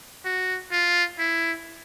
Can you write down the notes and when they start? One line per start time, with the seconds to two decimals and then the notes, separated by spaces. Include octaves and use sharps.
0.25 F#4
0.72 F4
1.19 E4